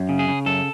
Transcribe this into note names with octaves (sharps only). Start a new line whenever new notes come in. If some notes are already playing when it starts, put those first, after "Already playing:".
Already playing: F#2
C#3
G#4
C#3
F#2 A4